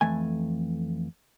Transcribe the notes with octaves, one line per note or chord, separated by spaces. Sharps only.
F2 E3 A3 G#5